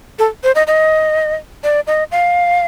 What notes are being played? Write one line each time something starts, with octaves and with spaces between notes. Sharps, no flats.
A4
C5
D#5
D#5
D5
D#5
F5